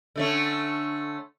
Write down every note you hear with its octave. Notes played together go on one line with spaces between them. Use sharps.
D3 A3 C#4